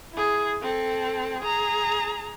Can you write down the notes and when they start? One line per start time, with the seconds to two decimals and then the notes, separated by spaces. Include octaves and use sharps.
0.12 E4 G#4
0.62 C4 A4
1.40 G#4 A#5